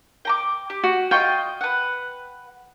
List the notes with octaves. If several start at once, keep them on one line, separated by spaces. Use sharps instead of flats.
G5 A#5 D6
G4
F#4
F4 D#5 G5 C#6
B4 F#5